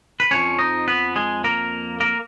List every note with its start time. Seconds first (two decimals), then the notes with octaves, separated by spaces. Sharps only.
0.20 B4
0.31 F2 F3 C#4 C#5
0.59 D#4 D#5
0.88 B3 B4
1.16 G#3 G#4
1.44 A#3 A#4
2.00 A#3 A#4